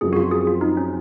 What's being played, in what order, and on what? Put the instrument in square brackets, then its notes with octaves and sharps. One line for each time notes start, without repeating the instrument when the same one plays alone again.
[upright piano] F#2 F3 C4 [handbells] G#4
[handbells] F#4
F4
G#4
F4
D#4
C#4